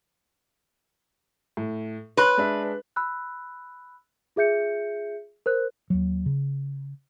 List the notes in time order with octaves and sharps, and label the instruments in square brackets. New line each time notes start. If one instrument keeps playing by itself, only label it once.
[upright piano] A2
[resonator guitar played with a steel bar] B4 [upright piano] C#5 C6 F#6
[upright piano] G#3 D4 E5
[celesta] B5 E6 F#6
F4 G#4 E5 G6 C#7
A#4 C5 F#6
[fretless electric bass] D#2 F#3
C#3